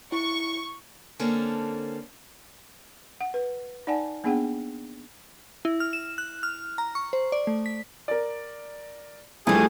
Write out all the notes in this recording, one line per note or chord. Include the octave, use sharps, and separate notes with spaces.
E4 C#6
D3 A#3 C4 C#4 A4
F#5
B4
D#4 D5 F#5 G#5 A5
A#3 B3 D4 G#4 F#5 G5
E4
F6
E7
F#6
F6
A#5
C#6
C5
D5
A3
B6
A#4 D5
G2 E3 F3 G3 A3 G#4 G#5 D#6